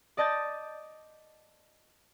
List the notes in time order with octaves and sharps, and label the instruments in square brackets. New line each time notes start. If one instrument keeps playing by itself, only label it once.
[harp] D5 D#5 A5 G6 A6